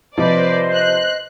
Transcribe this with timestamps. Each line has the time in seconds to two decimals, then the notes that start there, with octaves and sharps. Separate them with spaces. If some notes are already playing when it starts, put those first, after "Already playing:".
0.18 C3 F3 B4 C5 D5 D#5
0.74 F#6